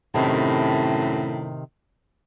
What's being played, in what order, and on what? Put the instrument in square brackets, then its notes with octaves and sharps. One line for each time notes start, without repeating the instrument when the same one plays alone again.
[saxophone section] F#2 A2 [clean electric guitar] C3 D#3